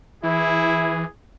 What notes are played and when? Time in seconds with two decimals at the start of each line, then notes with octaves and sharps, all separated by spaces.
0.23 E3 E4 G#4